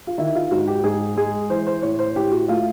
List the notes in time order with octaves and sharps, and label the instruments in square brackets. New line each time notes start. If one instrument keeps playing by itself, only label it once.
[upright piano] F4
D#3 E4
F4
G#2 F#4
G4
G#2 G#4
G#3 G#4
E3 C5
C5
A2 C#5
C5
A2 G4
F#4
A3 F4